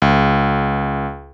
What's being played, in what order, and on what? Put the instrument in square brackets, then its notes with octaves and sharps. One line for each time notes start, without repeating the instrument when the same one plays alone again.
[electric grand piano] C#2